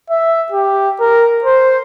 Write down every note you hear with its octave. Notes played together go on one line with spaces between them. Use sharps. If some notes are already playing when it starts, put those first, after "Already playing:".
E5
G4
A#4
C5